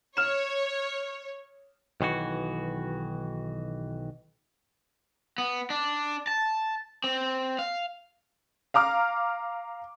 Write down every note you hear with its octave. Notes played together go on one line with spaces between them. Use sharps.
C#5 F6 E7
B1 D#3 E3 F#4
B3
D4
A5
C4
F5
F5 A#5 D6 F6